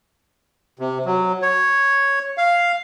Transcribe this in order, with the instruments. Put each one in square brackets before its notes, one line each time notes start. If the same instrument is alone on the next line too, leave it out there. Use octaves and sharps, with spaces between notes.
[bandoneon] C3
F#3
C#5
F5